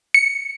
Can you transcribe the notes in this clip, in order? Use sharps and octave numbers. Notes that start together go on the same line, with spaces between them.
C#7